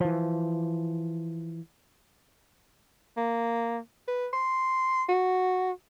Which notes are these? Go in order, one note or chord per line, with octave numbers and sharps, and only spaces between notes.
E3 F3
A#3
B4
C6
F#4